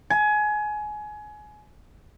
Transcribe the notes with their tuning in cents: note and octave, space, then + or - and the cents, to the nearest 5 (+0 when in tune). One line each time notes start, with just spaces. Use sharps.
G#5 +25